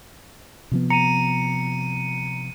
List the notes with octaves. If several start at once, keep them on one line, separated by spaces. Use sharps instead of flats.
C3 F3 B3
A#5 C#7 D#7